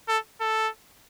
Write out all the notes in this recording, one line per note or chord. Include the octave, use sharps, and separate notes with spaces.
A4
A4